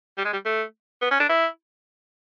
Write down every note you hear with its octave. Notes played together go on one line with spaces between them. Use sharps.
G3
G#3
G3
A3
B3
C#4
D4
E4